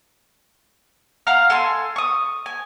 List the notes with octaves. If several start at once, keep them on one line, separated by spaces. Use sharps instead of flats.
F5 F#5 A#5 F6
A4 G#5 C6
C#6 D#6
G#5